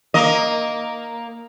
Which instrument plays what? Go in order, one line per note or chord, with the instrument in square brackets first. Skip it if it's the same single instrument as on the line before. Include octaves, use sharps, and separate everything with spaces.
[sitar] A#3 D#5